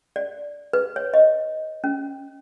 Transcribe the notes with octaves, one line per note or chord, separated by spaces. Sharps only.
D5
B4
C#5
D#5
C#4